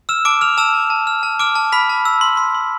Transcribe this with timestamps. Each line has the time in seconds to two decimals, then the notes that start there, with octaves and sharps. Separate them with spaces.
0.09 E6 F6 E7
0.25 A5 D6 D7
0.41 F6 F7
0.58 A5 E6 E7
0.74 A5
0.90 A5
1.07 F6
1.23 A5
1.40 D6 F6 D7
1.55 A5
1.72 B5 F6 B6
1.89 A5
2.05 E6
2.21 C6
2.37 C6
2.55 C6